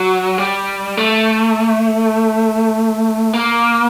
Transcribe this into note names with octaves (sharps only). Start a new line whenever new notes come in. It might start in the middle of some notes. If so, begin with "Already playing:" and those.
Already playing: F#3
G3
A3
A#3